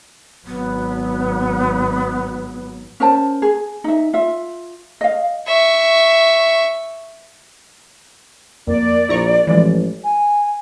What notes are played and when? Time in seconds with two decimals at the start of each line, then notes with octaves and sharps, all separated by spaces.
0.47 G#1 F#3 B3
3.00 C#4 A#4 C5 A5
3.42 G#4
3.84 D#4 E5
4.13 F4 E5
5.01 D#5 F5
5.47 E5 C#6
8.67 F2 A#3 D5
9.09 A#1 E4 A#5 C#6
9.47 A1 E3 F3 G#3
10.04 G#5